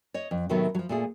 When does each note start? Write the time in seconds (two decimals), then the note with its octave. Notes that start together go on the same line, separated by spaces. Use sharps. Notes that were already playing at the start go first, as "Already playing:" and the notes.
0.14 C#5 D#5
0.31 F2
0.49 A2 C3 D#3 F#3 A3 B3
0.75 F3 F#3
0.89 A#2 A3 G#4